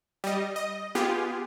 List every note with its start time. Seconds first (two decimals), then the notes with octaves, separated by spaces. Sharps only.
0.24 G3 D#5
0.56 D#5
0.95 B3 F4 G4 G#4